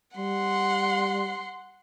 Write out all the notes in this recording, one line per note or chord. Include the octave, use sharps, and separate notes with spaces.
G3 F#5 C6